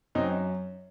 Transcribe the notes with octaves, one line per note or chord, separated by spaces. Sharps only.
F#2 C4 D#4